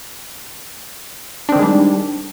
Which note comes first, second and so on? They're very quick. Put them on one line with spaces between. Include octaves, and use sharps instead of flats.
D4 C4 D#3 G#3 G3